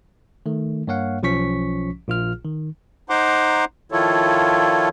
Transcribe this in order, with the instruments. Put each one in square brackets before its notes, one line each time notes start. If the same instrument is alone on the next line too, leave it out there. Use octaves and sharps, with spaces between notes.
[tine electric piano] D#3 A3
G2 A#3 C#5 F5 F#5
B1 F3 C#4 C#6 B6
A#1 F4 F6
D#3
[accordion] D#4 C5 F#5 A#5 C6 D6
D#3 F3 E4 F4 A4 C#5